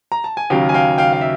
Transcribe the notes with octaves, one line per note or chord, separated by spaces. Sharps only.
A#5
A5
G#5
D#2 C#3 F#3 F5 G5
G#5
F5 G5
F5 G5
F5
E5